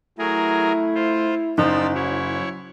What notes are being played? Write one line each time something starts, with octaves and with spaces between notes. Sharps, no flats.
F#3 A3 E4 G#4 A#4
F4 C5
F#1 F3 D#4 D5 E6
F#3 E4 C#5